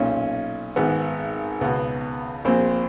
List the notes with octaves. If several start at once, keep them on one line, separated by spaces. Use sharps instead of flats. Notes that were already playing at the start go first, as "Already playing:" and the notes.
Already playing: B1 A#2 C#4
G#1 G#2 D#3 B3
C#2 B2 B3
A#1 A#2 C4